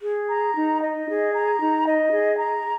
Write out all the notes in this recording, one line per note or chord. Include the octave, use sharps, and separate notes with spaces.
G#4
A#5
D#4
D#5
G#4
A#5
D#4
D#5
G#4
A#5